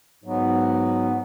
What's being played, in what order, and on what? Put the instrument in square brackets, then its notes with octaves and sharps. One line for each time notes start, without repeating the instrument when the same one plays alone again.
[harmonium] G#2 F#3 B3